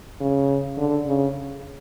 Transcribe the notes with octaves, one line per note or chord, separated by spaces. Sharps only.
C#3
D3
C#3